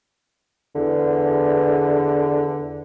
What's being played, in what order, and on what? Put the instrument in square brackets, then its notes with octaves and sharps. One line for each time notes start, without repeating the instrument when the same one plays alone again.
[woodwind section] E2 D3